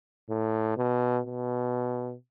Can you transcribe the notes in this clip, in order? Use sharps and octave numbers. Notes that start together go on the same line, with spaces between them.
A2
B2
B2